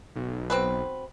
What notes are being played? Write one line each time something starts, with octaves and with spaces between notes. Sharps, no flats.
B1
C4 F#4 B4